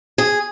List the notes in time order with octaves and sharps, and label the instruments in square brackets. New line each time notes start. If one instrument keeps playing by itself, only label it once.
[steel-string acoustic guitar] G#4